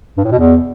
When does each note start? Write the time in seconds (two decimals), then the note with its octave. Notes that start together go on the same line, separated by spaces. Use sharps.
0.17 G2
0.25 A2
0.32 B2
0.39 E2